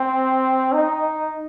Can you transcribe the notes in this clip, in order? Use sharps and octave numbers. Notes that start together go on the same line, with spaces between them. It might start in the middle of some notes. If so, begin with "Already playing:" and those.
Already playing: C4
D#4